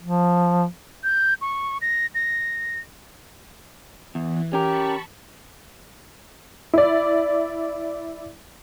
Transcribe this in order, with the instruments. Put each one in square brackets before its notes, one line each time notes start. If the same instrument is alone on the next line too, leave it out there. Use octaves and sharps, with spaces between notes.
[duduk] F3
[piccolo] G6
C#6
A#6
A#6
[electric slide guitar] E2 [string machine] E3
[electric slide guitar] C#4 A#4 [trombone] G4 [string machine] A5 B5 C#6
[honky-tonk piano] E4 D5